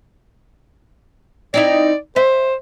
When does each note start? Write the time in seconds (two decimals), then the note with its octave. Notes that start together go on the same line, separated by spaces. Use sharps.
1.54 C4 D#4 E4 D5
2.16 C5 E5